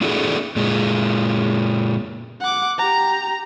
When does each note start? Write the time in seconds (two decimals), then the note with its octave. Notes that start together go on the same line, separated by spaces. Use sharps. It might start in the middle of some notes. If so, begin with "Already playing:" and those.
0.01 A#3 D4 E4 F#4 G#4 A4
0.56 A#2 G#3
2.41 F#5 D6
2.78 G4 A#5